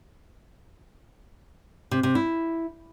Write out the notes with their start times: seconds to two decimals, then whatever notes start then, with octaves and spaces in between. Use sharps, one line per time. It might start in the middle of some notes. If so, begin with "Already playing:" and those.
1.91 C3
2.03 C3
2.15 E4